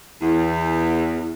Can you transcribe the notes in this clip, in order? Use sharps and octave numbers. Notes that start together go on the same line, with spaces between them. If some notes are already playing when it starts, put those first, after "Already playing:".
E2